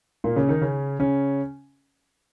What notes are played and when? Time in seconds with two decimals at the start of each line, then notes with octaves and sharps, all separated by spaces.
0.24 A#2 A#3
0.36 C#3 C#4
0.49 D#3 D#4
0.62 C#3 C#4
0.99 C#3 C#4